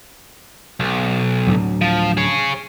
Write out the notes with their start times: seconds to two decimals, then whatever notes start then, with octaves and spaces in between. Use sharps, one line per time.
0.80 B1
1.47 D2 A2 F#3
1.81 F3
2.17 G#4 C#5